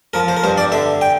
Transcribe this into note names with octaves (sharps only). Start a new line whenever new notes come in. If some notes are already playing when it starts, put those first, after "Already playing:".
F3 A#4
C5
A#4
G2 C5
D5
D3 E5
G5